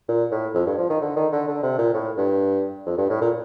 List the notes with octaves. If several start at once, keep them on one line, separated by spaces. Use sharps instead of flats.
A#2
A2
F2
G2
F3
D#3
D3
D#3
D3
D3
C3
A#2
A2
G2
F2
G2
A2
A#2